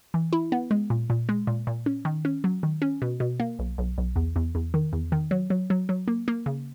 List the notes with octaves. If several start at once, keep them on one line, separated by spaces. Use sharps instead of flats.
E3
E4
B3
G#3
A#2
A#2
G#3
A#2
A#2
C#4
D#3
C#4
F#3
D#3
C#4
B2
B2
A#3
B1
B1
B1
E2
E2
E2
D#3
E2
D#3
F#3
F#3
F#3
F#3
A#3
A#3
C#3